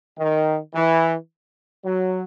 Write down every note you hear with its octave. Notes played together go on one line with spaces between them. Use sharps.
D#3
E3
F#3